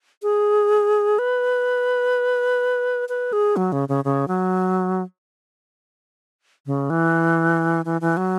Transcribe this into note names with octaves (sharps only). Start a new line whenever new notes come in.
G#4
B4
B4
G#4
F#3
C#3
C#3
C#3
F#3
C#3
E3
E3
E3
F#3